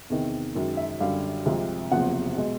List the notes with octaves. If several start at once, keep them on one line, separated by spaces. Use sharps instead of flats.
E2 C3 D#3
F#2 D#3 G#3
E5
F#2 D3 G3 F5
C2 C3 F3 G#3
F#1 E2 C3 F3 F#5
B2 G#3